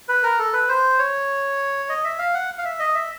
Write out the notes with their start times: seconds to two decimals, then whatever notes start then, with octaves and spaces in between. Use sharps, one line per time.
0.09 B4
0.23 A#4
0.39 A4
0.53 B4
0.68 C5
0.99 C#5
1.89 D#5
2.04 E5
2.19 F5
2.34 F#5
2.58 F5
2.65 E5
2.79 D#5
2.94 E5